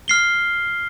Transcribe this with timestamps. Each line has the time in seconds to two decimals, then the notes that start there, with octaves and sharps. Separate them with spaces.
0.08 F6 C7 G7